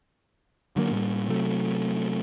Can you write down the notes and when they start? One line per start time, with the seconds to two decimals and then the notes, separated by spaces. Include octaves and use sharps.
0.76 D3 F#3 A#3
0.91 A2 G3 A#3
1.28 C3 F#3 A3